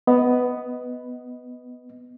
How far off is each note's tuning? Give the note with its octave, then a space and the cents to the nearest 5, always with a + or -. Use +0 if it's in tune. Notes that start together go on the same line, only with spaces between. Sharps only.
B3 +5 D#5 +10